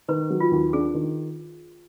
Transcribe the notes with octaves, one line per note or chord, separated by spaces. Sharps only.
D#3 B4
F#3
F4
D#2
D4 G#4
D#3